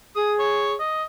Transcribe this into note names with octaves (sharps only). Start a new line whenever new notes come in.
G#4 D#6
C#5
D#5